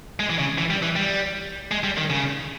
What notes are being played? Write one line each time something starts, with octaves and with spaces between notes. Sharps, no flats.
G#3
E3
C#3
E3
G3
E3
G3
G#3
G3
D#3
C#3